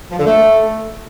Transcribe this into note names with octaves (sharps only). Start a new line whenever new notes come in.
F3
D3
A3